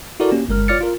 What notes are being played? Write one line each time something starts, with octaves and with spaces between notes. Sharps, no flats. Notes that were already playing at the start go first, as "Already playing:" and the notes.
E4 F#4 A4 A#4 D5
A#3 C#4 G4
G1 G#3 A#4 F6
F4 C#5 D5 F6 A6 C#7
F4 A#4